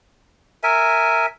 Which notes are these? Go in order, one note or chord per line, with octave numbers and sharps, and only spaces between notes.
A#4 E5 G#5